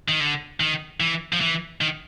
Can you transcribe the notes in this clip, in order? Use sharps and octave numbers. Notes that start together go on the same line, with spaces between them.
D#3
D3
D#3
E3
F3
E3
D#3